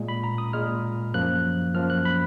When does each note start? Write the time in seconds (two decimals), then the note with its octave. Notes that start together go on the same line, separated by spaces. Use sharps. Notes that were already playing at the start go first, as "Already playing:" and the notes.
Already playing: A#2 G#3
0.08 B5
0.24 A#5
0.38 D#6
0.53 A#2 G#3 F6
1.14 F#2 F3 A#3 F#6
1.74 F#2 F3 A#3 F6
1.90 F#6
2.05 B5